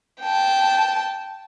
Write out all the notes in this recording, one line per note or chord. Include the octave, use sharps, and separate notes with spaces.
G5 A5